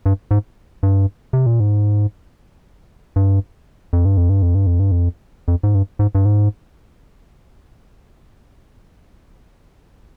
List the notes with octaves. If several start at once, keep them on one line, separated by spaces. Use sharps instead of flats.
G2
G#2
G2
C3
A#2
G#2
G2
F2
G2
F2
G2
F2
G2
F2
G2
F2
F2
G#2
G2
G#2
G2
G#2